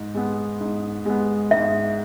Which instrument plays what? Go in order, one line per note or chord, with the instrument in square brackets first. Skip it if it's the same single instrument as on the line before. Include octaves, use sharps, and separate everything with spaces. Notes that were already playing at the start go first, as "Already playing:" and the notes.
Already playing: [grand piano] G#2
G#3 B3
G#2
G#3 B3
[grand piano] G#2 [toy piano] E5